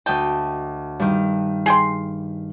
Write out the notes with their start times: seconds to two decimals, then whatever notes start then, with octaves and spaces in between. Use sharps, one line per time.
0.06 D2 D#5 G5 A5
1.00 G2 D#3
1.66 G#4 G5 C6